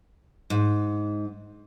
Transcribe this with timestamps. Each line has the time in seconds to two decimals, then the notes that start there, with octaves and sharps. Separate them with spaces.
0.50 G#2